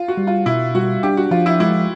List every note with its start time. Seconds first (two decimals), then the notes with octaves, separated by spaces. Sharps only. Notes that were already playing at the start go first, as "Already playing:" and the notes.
Already playing: F4
0.08 F#4
0.17 G3
0.27 F4
0.46 B2 E4
0.75 G3 F#4
1.03 D4 G4
1.17 F#4
1.31 F3 F4
1.46 E4
1.60 G#3 E4